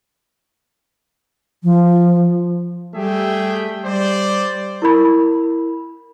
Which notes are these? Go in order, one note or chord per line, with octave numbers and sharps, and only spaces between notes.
F3
G3 A3 G4 G#4 E5 G5
G3 C5 D5
E4 A#4 B5